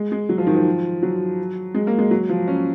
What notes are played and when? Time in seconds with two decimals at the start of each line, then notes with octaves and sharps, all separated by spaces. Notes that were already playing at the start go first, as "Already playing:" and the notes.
Already playing: G#3
0.12 G#3
0.29 F#3
0.38 F3
0.47 D#3
0.55 F3
1.03 F#3
1.75 G#3
1.87 A#3
1.99 G#3
2.11 F#3
2.29 F3
2.48 C#4